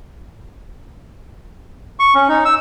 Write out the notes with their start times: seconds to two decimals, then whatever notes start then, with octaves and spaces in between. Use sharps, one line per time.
2.00 C#6
2.15 C#4
2.28 D#4
2.45 E6